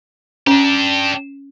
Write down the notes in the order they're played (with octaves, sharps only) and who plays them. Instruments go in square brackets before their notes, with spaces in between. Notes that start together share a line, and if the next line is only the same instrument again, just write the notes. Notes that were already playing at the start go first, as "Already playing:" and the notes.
[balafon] C#4 [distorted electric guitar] D4 G4